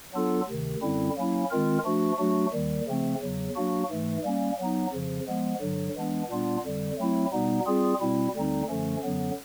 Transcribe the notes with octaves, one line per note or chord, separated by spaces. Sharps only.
F#3 B3 D4 F4 A4
D2 C3 D#3
F#2 D3 G3 C4 E4
F#3 A#3 C#4 E4
D#3 G#3 C4 F4 A#4
F3 A3 D4 F#4
F#3 A3 D4 F#4
D#2 D#3 G3
C#3 F3 A3 C4
E2 C#3 F#3
F#3 A#3 D4 F#4
G#2 E3 A3
G3 A#3 C#4
F#3 B3 D#4
F2 C#3 F3
F3 G#3 B3
G2 D3 F#3
E3 G#3 B3 D4
A#2 G3 B3 D4 F4
F2 D3 G3
F#3 A3 C4 E4
B2 G3 B3 D#4
G3 C4 F4 G#4
B2 G3 C4 E4
D2 D3 G3 C4 D#4
F#2 D3 F3 A3 C#4
F#2 D3 F#3 B3